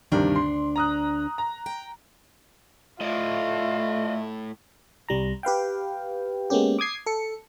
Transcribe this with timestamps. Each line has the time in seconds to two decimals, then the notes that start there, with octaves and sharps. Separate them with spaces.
0.12 D2 G2 C3 D#3 D4
0.36 C6
0.76 A#5 D#6 F#6
1.38 A#5
1.66 G5
3.01 A2 A3 F4 D5 D#5
5.09 C2 G3 A#5
5.43 G4 B4 F5 G5
6.50 G#3 A#3 B3 C#4 G4
6.79 D6 D#6 G#6 C7
7.06 A4 C#7